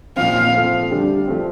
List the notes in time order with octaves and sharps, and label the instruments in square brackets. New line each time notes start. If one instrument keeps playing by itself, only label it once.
[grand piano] A#2 F3 C4 [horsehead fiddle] F5
[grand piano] F3 A3 C4
D3 G3 D4 G4
F3 A3 C4